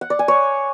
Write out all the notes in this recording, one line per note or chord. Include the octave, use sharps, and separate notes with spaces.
F#5
D5
G#5
C#5